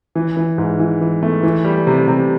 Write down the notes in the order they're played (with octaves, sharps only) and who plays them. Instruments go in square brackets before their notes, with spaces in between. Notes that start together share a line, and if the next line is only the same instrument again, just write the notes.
[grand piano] E3
E3
G#2
E3
E3
A3
E3
G3
C3
C3